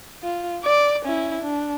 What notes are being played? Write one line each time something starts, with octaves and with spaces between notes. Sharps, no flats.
F4
D5 D6
C#4 E4
D4